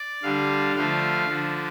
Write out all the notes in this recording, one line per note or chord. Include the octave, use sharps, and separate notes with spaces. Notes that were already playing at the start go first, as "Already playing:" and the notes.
Already playing: D5
D3 G3 D4 F5
D3 F3 A3 F5
D3 F3 D4